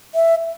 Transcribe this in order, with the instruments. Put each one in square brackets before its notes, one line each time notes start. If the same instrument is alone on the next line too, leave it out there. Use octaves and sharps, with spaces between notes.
[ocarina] E5